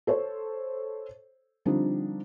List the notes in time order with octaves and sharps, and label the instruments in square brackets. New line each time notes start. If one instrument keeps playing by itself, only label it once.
[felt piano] A4 C5 C#5
D3 F3 G3 C4 D4 D#4